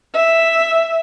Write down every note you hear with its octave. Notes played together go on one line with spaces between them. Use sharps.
E5